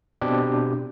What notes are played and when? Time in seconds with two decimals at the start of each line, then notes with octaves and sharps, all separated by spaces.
0.21 B2 C4 D4 G4